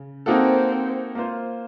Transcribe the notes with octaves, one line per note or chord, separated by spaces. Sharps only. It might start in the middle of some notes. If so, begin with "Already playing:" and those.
Already playing: C#3
A#3 C4 D#4 F#4 A4
A#3 F4 C5